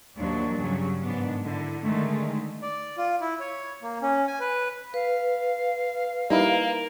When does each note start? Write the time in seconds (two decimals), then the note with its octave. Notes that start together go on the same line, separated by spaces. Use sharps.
0.19 D#2 A#2 F3 F#3 D4
0.60 G2 C#3 F#3
1.04 G#2 D#3 B3 D4
1.42 D3 E4
1.82 D3 D#3 G#3 A3
2.62 D5
2.97 F4
3.21 E4
3.40 C#5
3.82 A#3
4.02 C#4
4.27 G#5
4.40 B4
4.94 B4 F5
6.30 G3 A#3 D#4 E4